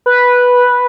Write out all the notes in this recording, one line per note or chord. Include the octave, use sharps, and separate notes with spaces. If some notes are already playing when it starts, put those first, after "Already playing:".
B4